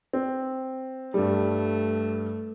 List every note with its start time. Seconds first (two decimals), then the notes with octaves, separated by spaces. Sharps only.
0.13 C4
1.14 G2 G3 A3